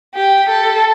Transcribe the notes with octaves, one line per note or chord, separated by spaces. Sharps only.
G4
A4